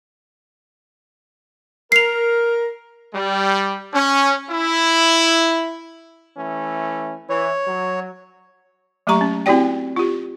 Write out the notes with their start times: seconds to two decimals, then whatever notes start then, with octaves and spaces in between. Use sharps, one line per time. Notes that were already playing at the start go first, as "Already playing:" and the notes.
1.92 A#4 C7 F7
3.14 G3
3.93 C#4
4.49 E4
6.37 E3 A3 C#4
7.29 E3 C#5
7.66 F#3
9.07 F#3 A3 A#3 G4 A#5 C#6
9.21 C#4
9.46 C4 E4 F#4 G4 D5 G5
9.96 F4 G4